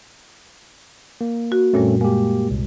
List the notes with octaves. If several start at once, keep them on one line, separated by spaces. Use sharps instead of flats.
A#3
F#4
F#2 A#2 G3 A3 C4 C#4
G#3 A#3 G4
C2